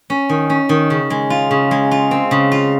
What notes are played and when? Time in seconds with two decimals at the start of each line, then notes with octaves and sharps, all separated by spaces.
0.10 C#4
0.29 D#3
0.50 C#4
0.69 D#3
0.90 C#3
1.10 G#3
1.30 F4
1.51 C#3
1.71 G#3
1.91 F4
2.11 C4
2.31 C#3
2.52 F4